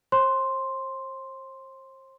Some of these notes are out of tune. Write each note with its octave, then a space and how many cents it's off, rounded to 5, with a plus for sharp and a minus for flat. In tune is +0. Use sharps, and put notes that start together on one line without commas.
C5 +35 C6 +0